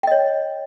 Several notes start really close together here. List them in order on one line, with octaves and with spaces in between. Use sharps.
G5 D#5 C#5